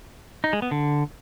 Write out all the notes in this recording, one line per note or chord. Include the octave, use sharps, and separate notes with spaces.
D#4
G#3
B3
D3